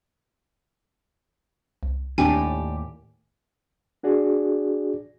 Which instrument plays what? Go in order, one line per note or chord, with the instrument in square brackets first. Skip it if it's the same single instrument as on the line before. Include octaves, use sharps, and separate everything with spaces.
[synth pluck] C2
[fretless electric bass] D#2 A2 [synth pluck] C4 D4 [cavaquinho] G4 D5 A5 [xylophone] G#5
[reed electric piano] D4 F#4 G#4 D5